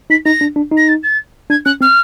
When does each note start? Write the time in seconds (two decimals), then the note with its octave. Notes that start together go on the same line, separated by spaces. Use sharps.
0.10 D#4 B6
0.26 D#4 A#6
0.41 D4
0.56 D4
0.72 D#4
0.77 A#6
0.88 A6
1.03 A6
1.50 D4 G#6
1.65 C#4 F#6
1.81 C4 F6